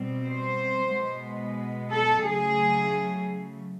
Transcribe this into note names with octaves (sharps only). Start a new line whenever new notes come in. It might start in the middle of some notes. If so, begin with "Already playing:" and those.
Already playing: B2 G3 C4
C5
B2 G#3 B3
A4
C#3 F#3 A3 G#4